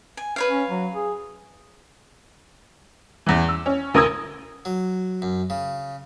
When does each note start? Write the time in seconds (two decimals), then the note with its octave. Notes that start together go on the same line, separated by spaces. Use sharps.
0.17 G#5
0.36 B4 C#5 F5
0.50 C#4
0.71 F#3
0.95 G#4
3.26 E2 E3
3.49 E6
3.66 C#4
3.94 D2 A#4 D#6 E6 G#6
4.65 F#3
5.22 F#2
5.50 C#3